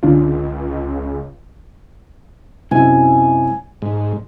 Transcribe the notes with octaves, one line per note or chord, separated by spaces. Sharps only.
C#2 D3 D4 F4
F#2 C3 G#3 E4 G#5
G#2